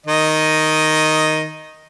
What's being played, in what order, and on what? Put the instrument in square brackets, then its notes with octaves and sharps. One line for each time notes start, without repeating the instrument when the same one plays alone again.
[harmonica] D#3 D#5